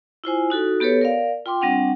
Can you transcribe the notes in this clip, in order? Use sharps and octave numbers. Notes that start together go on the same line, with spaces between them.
E4 F4 C5 G#5
D#4 F#4 A4
B3 G4 A4 B4 C#5
A#4 D5 F5
F4 G5 C6 D6
G3 C4 D4 F#5